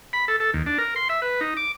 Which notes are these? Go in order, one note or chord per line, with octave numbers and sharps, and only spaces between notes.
B5
A4
A4
D#2
D4
A#4
C6
E5
B4
D#4
D6